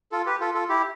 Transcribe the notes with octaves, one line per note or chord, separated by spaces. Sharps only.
F4 A4
G4 B4
F4 A4
F4 A4
E4 G4